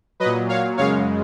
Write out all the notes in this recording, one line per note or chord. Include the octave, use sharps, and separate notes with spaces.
F#3 B4 D#5
A#2
C#5 F5
F#2 C#3 G#3 C#5 F5